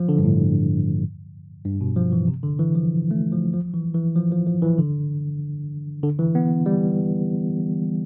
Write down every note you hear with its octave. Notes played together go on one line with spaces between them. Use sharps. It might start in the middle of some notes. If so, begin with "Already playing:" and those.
Already playing: F3
D3
G2
A2
G2
B2
F3
E3
C3
D3
E3
F3
A3
F3
F3
E3
E3
F3
F3
F3
E3
D3
D3
E3
B3
G3